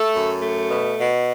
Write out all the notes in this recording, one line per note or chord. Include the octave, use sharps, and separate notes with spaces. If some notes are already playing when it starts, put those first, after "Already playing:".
Already playing: A3 A4
F#2
A3
B2
B2